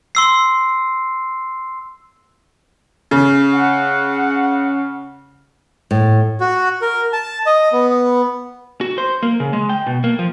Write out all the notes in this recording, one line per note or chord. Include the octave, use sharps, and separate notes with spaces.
C6 E6 C7
C#3
F#5
A2
F#4
A#4
A5
D#5
B3
F#4
C5
A#3
C#3
G#3
G5
B2
A#3
F3